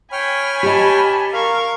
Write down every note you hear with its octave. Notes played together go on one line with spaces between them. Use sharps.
C#5 G5 G#5 B5 F6
G4 D#5 A5
A#4 F5 C#6